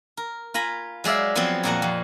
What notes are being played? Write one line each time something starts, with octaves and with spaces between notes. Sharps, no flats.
A#4
F4 G#5 A#5 B5
F#3 G#3 D5 E5 F5
F3 F#3 G#3 B3 C4
F2 A#2 F3 G3 F#5 A#5
F2